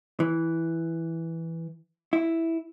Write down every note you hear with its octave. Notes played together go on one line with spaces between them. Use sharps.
E3
E4